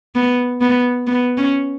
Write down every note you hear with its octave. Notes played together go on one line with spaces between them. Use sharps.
B3
B3
B3
C#4